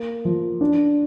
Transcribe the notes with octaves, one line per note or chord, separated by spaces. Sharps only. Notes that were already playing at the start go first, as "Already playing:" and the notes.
Already playing: A#3
F3
D4